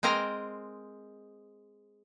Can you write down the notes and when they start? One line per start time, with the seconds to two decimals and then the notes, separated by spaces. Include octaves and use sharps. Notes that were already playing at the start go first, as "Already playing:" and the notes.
0.03 G#3 C4 A#4 C5 D#5 A#5